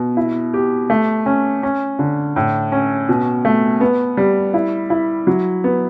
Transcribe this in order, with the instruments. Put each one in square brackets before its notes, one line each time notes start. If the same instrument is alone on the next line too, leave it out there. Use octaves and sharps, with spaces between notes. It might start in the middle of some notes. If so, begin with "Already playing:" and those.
Already playing: [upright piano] B2
E4
G4
A3
C#4
C#4
D3
A2
C#4
B2
A3
B3
G3
E4
E4
F#3
B3